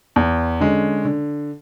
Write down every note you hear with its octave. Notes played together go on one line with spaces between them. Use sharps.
E2
D3 G#3 C#4
D3